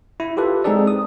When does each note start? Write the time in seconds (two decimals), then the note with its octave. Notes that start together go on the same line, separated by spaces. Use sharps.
0.20 E4
0.37 F4 G4 A4 B4
0.64 G#3 C4 D#4 G#4 A4 D5
0.87 D#6